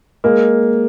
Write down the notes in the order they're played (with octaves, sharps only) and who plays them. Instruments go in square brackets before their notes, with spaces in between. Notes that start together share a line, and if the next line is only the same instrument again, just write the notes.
[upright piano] G#3 A#3